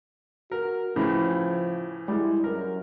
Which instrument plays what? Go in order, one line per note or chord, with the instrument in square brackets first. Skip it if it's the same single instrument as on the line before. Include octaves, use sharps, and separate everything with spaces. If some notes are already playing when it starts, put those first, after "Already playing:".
[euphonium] F#4 [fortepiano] A#4
[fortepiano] A2 C#3 E3 [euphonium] F3
[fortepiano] G3 G#3 [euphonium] E4
[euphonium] F#2 [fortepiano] A#4